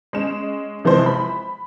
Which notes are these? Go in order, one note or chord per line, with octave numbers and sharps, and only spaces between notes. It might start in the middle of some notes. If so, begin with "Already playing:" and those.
G#3 C#4 E7
C3 E3 F3 G#3 C5
B5